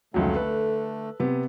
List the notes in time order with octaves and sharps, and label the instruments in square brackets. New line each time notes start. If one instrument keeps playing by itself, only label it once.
[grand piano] F1 C#2 F#3 [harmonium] D3 A3
[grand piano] A4 B4
C3 B3